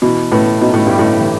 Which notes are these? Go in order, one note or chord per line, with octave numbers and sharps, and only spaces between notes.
B2 E3
A2 B3
B2 D#4
A2
G2 G4
A2
E3